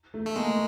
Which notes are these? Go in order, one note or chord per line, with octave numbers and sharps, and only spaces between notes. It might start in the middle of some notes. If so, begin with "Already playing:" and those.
A3
A3
G#3 A#3